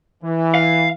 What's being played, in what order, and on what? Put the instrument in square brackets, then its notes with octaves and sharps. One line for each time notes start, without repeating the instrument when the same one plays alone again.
[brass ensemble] E3
[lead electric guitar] F5